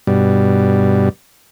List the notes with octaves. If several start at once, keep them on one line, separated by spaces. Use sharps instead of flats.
G2 B2 G3